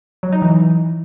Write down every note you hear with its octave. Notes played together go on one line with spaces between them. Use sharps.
F#3
D#4
E3